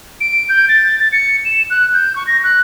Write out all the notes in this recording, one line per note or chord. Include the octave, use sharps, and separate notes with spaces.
D7
G6
A6
A6
C#7
E7
F#6
G6
C#6
A#6
F#6